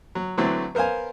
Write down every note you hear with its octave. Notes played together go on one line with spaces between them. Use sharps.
F#3
D3 E3 F#3 A3 C4
B3 A#4 C5 F5 G#5